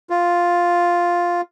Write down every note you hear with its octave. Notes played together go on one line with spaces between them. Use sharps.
F4